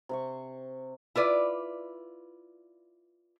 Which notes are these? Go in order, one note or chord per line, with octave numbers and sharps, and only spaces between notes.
C3 C5 C#6
E4 F4 B4 D5